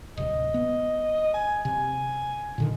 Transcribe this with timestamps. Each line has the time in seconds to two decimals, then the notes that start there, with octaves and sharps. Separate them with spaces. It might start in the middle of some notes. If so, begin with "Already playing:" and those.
0.17 D1 C3 D#5
0.54 B3
1.34 G#5
1.65 C3 G#5
2.58 A#2 D3 D#3